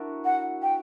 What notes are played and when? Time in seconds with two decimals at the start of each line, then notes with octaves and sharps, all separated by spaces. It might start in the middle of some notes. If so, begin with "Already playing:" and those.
Already playing: D4 E4 F#4 A#4
0.25 F#5
0.63 G5